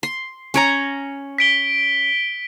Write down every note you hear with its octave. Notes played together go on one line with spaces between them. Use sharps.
C6
C#4 C#5 A#5
B6 D7 G7